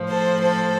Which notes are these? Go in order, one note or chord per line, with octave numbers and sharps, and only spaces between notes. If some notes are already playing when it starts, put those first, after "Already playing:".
Already playing: A2 F3
A4 C5
A4 C5